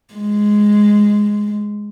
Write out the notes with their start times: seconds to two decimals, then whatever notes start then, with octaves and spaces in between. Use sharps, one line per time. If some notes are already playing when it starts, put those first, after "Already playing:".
0.14 G#3